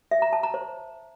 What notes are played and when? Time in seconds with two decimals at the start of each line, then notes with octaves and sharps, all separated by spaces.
0.11 E5
0.22 A#5
0.33 A5
0.43 A#5
0.54 C5